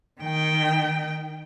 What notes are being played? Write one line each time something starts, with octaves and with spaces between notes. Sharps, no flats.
D#3 G5